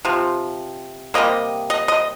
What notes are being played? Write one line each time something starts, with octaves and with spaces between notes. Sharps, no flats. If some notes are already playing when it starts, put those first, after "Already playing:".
C3 F3
C3 G3 A#3 D#5
D#5
D#5